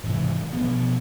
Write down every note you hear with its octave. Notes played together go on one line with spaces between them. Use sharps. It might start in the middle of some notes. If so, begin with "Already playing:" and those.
G#2 C3 E3
B2 F3 B3